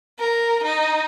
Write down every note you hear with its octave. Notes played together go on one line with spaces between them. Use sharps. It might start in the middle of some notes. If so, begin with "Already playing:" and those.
A#4
D#4